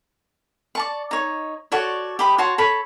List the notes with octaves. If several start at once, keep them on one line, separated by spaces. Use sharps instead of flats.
D5 A5 C#6
D#4 C#5
F#4 A4 C#5 D5
G4 B5 D#6
F#4 C#5 A5 C6
A4 C#5 B5